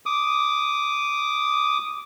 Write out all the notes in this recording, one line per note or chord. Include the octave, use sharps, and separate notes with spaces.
D6 D#6